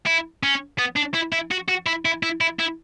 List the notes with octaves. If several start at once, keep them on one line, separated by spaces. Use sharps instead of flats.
E4
C#4
B3
D4
E4
E4
F#4
F#4
E4
E4
E4
E4
E4